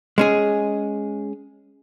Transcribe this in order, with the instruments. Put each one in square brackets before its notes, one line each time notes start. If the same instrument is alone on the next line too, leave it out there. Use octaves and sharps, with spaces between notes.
[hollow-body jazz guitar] G#3 C#4 G#4